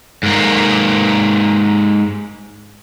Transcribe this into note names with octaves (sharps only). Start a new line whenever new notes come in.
G#2 A#3